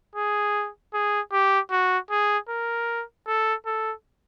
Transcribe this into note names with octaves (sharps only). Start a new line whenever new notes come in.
G#4
G#4
G4
F#4
G#4
A#4
A4
A4